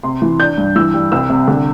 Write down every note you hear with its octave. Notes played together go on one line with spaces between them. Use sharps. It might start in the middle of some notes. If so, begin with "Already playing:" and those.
C3 C6
E3
D4 G6
G2
E3 E6
G3
C2 E6
C3
D3